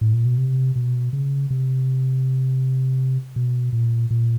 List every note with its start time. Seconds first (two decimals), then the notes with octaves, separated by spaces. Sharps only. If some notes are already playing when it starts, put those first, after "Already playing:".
0.01 A2
0.13 A#2
0.25 B2
0.38 C3
0.76 B2
1.13 C#3
1.50 C3
3.36 B2
3.72 A#2
4.11 A#2